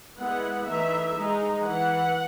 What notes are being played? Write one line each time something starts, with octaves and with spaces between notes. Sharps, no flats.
G#3 B3 E4 F#5
E3 A3 D#4 E5
G#3 D#4
E3 F#5